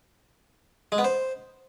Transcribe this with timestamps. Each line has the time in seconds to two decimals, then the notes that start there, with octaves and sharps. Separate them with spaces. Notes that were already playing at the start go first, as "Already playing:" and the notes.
0.92 G#3
0.98 B3
1.04 C5